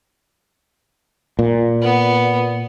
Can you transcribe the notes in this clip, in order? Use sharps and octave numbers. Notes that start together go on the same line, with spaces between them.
A#2
B3